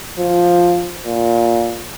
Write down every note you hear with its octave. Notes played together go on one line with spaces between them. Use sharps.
F3
A#2